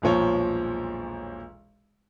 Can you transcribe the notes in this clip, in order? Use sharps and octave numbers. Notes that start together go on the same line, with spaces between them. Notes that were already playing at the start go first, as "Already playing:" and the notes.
E1 B1 A#2 F3 C#5